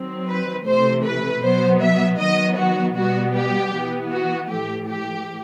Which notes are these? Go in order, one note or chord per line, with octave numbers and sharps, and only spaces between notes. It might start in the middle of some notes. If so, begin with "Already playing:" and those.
Already playing: D#3 F#3 C4
B4
C3 E3 A3 C5
B4
B2 F#3 B3 C5
E5
D#3 F#3 B3 D#5
F#4
B2 G3 B3 F#4
G4
E3 B3
F#4
A2 E3 A3 G4
G4